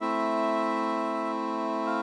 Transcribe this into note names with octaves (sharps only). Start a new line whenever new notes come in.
A3 C4 E4 E5
F5